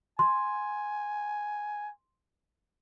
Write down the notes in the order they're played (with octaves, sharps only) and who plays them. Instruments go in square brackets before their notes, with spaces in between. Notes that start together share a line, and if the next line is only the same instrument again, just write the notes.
[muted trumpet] G#5 [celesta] C6